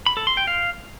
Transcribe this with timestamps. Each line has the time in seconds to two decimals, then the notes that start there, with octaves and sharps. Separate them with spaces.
0.06 B5
0.17 A4
0.27 C6
0.37 G5
0.47 F5